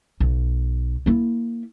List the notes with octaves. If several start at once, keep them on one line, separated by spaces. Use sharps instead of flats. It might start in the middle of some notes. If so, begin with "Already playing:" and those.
B1
A#3 E4